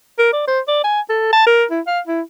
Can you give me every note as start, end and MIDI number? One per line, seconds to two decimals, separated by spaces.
0.19 0.32 70
0.33 0.46 74
0.48 0.60 72
0.68 0.80 74
0.84 1.01 80
1.09 1.29 69
1.33 1.46 81
1.47 1.64 70
1.71 1.80 64
1.87 2.00 77
2.07 2.21 64